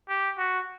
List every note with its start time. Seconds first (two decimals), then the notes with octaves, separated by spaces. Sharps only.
0.09 G4
0.38 F#4